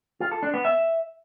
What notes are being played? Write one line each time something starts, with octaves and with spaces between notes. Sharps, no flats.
F4
A4
D4
B3
E5